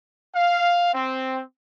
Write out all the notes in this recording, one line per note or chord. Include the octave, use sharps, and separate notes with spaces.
F5
C4